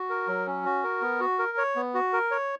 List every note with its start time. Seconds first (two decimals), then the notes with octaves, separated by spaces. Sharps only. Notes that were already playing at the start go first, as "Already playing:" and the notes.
Already playing: F#4
0.10 A#4
0.28 F#3
0.47 C#4
0.65 F#4
0.84 A#4
1.02 B3
1.20 F#4
1.39 A#4
1.57 C#5
1.76 B3
1.95 F#4
2.13 A#4
2.31 C#5